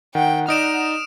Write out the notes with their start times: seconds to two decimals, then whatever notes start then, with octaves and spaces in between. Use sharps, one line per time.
0.15 D#3 F#5 G5
0.48 D#4 D5 D#5 D#6 F6 D7 E7